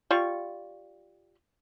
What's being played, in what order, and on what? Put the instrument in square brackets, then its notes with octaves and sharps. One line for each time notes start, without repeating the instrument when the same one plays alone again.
[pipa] G3 F4 C#6